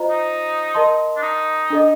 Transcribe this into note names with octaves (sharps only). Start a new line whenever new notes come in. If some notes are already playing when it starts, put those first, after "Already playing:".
Already playing: F4 C5 D#5 A#5
D#4
A#4 D#5 A5 C6
D4
D#4
D4 A4 D#5